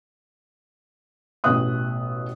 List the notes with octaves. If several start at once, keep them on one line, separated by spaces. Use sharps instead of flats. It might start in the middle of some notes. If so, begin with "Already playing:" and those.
A1 B2 B3 E5 D#6 F#6